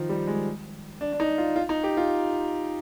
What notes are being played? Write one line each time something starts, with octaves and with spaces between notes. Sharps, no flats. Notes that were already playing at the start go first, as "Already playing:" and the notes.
Already playing: D#3 F3
G3
G#3
D4
D4
D#4
F4
F4
D#4
G4
F4